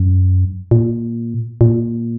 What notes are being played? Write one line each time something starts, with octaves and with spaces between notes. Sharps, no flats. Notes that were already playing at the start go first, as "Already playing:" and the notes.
Already playing: F#2
A#2
A#2